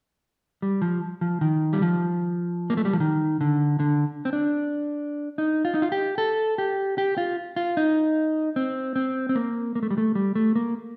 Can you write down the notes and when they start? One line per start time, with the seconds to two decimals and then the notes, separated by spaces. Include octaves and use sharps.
0.62 G3
0.82 F3
1.21 F3
1.41 D#3
1.73 G3
1.82 F3
2.70 A#3
2.77 A3
2.85 G3
2.93 F3
3.00 D#3
3.41 D3
3.80 D3
4.25 C4
4.33 D4
5.38 D#4
5.65 F4
5.74 D#4
5.82 F4
5.92 G4
6.18 A4
6.58 G4
6.98 G4
7.18 F4
7.56 F4
7.77 D#4
8.56 C4
8.96 C4
9.29 C4
9.35 A#3
9.75 A#3
9.83 A3
9.90 G3
9.98 A3
10.15 G3
10.35 A3
10.56 A#3